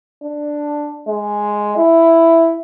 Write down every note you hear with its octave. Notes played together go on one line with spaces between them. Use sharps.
D4
G#3
E4